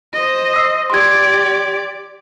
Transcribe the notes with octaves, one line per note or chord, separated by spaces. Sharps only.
C5 D#5
D#6 E6 C7
G4 D5 C6 G#6